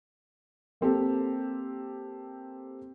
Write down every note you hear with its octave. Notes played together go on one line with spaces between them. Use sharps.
A#3 C4 G4 A4